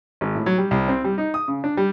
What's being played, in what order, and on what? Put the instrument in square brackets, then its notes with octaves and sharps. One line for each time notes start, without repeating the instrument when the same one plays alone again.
[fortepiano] G#1
A2
F#3
G3
C2
C4
G3
D#4
D#6
C#3
D4
G3